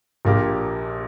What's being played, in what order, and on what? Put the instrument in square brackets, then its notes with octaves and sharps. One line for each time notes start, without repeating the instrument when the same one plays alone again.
[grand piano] A#1 A#2 A#3 G4